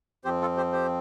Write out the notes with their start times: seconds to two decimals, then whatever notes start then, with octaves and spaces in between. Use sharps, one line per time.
0.24 F2 F3 C4 G4 C5
0.41 F4 A4
0.57 G4 C5
0.72 G4 C5